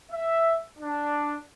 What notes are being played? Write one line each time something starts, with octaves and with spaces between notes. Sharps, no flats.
E5
D4